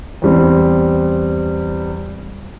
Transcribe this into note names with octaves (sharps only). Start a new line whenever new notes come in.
E2 G3 C4